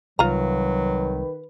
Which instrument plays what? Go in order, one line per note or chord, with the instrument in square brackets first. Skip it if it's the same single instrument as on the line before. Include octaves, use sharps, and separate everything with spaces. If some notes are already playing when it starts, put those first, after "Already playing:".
[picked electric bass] C2 [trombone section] D#3 B4 [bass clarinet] F#3 [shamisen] F4 A#5